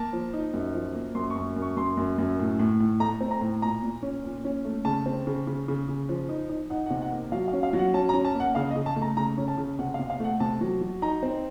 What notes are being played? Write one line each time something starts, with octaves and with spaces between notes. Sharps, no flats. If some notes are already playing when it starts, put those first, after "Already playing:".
Already playing: A#3 A5
F3
D#4
F#2
F3
A#3
F#2 C6
C#6
F#2
F#2
C#6
F#2 C6
F#2
F#2
A2
A2
A2
A3 A#5
C4
A#5
A2
A#2 A#5
A#2
C#4
A#2
C#4
A3
C#3 A5
C4
C#3
C#3
C#3
C#3
F3
D#4
D#4
D#4 F#5
F#5
C3
F#5
A#3
F#3 F5
F5
C#4
F5
F#3
F#5
C#4 A5
A#5
C#4
A5
A#3
F#5
C#3 F5
D#5
C#3
A5
A3
A#5
C#3 A#5
C#4
A5
C#3
C3 F#5
F5
C3
F5
A3 F#5
C3 A5
F#3
F#3
D#4 A#5
C4